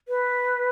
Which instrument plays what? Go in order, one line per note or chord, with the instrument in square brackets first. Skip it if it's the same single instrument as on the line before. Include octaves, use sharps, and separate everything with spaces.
[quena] B4